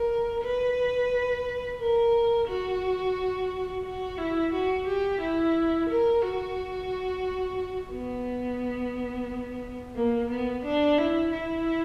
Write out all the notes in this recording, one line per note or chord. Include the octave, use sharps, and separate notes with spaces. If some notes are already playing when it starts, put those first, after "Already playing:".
Already playing: A#4
B4
A#4
F#4
F#4
E4
F#4
G4
E4
A#4
F#4
B3
A#3
B3
D4
E4
E4